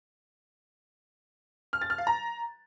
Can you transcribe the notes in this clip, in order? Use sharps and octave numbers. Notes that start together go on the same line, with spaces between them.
F6
A6
F6
F5
A#5